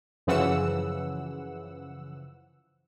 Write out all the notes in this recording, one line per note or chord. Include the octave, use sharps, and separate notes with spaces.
F#2 C#3 E3 F3 F#5 E6